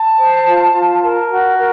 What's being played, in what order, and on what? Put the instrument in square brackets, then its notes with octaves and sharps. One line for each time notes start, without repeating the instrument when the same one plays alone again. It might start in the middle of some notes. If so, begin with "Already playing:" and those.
Already playing: [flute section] A5
C5
F4
F4
A#4
F#4
A#4